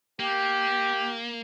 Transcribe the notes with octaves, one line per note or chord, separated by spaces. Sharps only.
A#3 G4